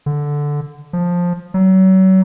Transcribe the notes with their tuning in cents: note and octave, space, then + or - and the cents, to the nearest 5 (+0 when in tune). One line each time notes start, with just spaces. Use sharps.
D3 -5
F3 +10
F#3 +35